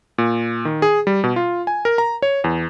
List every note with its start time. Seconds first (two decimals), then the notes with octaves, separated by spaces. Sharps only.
0.18 A#2
0.65 D#3
0.82 G#4
1.07 G3
1.24 B2
1.36 F4
1.67 G#5
1.85 A#4
1.98 A#5
2.22 C#5
2.44 E2